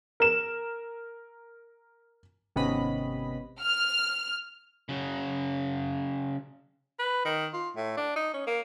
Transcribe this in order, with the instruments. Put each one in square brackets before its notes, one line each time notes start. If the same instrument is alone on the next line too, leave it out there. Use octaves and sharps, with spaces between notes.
[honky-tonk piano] A#4 E7
[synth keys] G#1 C3 B3 C#4 D#5 B5
[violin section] F6
[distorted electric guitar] C#3 F#3
[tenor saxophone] B4
D#3
F4
A2
D4
D#4
C#4
A#3